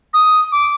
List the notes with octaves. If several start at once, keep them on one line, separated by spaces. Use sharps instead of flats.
D#6
D6